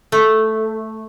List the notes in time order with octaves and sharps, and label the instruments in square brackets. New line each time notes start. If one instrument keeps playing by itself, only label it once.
[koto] A3